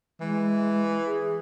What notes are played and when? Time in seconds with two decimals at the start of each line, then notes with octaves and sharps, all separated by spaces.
0.21 E3 G#3
1.06 G#4